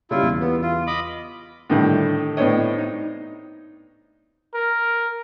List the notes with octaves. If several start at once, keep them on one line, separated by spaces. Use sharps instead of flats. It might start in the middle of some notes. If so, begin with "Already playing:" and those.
C#3 G3 C#4 E4 F4
E2
B3
F4
D#5 B5 D6
A2 D3 D#3 G3 A3
A2 B3 C4 D4 C#5 D#5
D#4
A#4